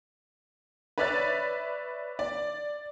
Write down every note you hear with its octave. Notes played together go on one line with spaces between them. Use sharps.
B4 C#5 D5 E5 F#6 A6
D5